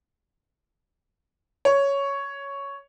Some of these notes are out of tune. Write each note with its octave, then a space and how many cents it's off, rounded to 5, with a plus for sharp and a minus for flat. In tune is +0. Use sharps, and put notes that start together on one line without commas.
C#5 +5